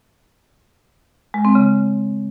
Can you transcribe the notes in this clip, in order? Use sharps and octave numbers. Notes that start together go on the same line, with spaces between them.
G#3
C4
C#3